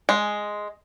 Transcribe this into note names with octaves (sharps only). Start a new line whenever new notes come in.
G#3